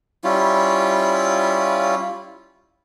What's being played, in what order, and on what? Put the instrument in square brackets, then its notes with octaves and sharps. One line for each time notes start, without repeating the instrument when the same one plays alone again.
[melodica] G3 C#4 E4 F4